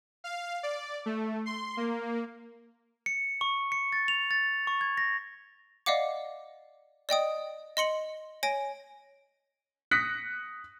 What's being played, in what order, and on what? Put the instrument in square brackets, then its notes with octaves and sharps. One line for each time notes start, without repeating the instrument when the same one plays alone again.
[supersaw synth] F5
D5
A3
C6
A#3
[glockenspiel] C#7
C#6
C#7
A6
F7
A6
C#6
G#6
A#6
[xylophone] D5 D#5 F5 F#5 D6
D5 D#5 G5 D#6
D#5 C6 C#7 F#7
C#5 G#5 A#6 D7
[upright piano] D#6 F#6 A#6 B6 C#7